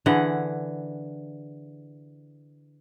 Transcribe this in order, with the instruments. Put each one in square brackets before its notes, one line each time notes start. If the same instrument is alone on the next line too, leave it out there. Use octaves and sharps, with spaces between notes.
[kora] D3 E3 G#4 F#5